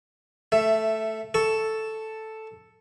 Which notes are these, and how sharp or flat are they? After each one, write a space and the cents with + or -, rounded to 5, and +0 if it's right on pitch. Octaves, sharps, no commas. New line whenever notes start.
A3 +0 E5 +15
A4 +0 C#6 +0